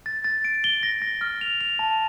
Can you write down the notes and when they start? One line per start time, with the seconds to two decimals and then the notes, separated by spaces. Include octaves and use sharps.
0.06 A6
0.24 A6
0.45 D7
0.64 G7
0.83 A#6
1.02 A#6
1.21 F6
1.41 F7
1.61 F7
1.79 A5